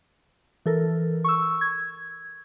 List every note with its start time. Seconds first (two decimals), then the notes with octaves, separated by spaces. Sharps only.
0.66 E3 A4 A#4
1.24 C#6 E6
1.61 G#6